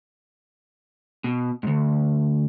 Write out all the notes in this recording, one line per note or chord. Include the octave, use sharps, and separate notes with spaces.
B2
D2 G#2